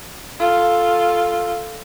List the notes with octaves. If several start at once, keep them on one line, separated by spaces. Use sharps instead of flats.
F4 A4